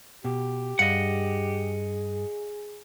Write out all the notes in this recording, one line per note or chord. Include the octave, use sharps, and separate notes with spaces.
B2 G4
G2 G#4 D#5 F5 F#5